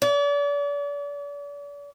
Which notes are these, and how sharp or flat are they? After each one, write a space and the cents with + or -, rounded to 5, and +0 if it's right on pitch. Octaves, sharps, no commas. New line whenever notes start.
D5 -40